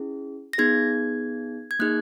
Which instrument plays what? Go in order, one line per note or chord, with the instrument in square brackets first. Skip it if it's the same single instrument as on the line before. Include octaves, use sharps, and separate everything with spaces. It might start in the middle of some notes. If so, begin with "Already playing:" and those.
Already playing: [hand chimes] C#4 E4 G#4
A#6
B3 D#4 G#4 G#6
G#6
A#3 D#4 G#4 F#6